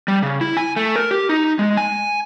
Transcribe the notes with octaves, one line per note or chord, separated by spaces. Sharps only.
G3
C#3
E4
G#5
A3
A#4
G4
D#4
G#3
G#5